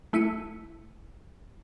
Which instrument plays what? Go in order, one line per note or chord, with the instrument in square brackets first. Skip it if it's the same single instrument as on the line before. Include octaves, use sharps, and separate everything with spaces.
[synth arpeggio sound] A3 E4 B6 C#7 D#7